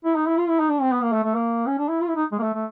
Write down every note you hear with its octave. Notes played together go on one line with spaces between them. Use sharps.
E4
D#4
E4
F4
E4
D#4
D4
C4
B3
A#3
A3
A3
A#3
C#4
D4
E4
F4
E4
D#4
G#3
A#3
A3
A3